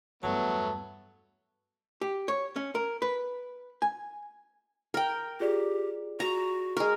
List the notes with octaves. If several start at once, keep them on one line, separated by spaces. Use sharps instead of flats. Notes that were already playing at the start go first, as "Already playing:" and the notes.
E2 G2 F#3 A3 B3 A5
G4
C#5
C#4
A#4
B4
G#5
A#4 G5
F4 G4 G#4 D5
F#4 A#5
G#3 A#4 C#6